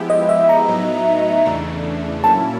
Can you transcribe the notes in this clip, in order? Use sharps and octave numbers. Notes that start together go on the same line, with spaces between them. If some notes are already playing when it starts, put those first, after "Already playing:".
Already playing: F3 G#3 B3 E4 G4
D#5
E5
A#5
A2 F#3 B3 D#4
E2 C#3 E3 A3 D4
A#2 F#3 A#3 C#4 E4 A5